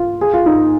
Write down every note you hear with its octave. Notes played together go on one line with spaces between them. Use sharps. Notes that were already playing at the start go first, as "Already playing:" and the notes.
Already playing: F4
G#4
F4
D#4